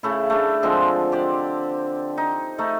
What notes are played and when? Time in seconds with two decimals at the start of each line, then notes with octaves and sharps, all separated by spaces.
0.03 C#3 A3 E4
0.30 A3 D4
0.63 D3 F3 G#3 C4
1.12 G4 C5 D5
2.17 D#4
2.58 A3 D#4